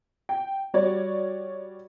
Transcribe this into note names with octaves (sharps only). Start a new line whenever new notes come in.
G5
G3 F#4 C#5 D5